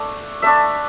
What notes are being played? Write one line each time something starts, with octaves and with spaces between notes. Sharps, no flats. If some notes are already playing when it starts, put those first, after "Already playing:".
Already playing: A3 D4
A3 D4 E5